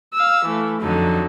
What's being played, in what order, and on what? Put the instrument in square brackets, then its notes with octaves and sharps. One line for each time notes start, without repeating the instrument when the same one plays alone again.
[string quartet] F5 E6
E3 A3
F2 D3 F#3 D#4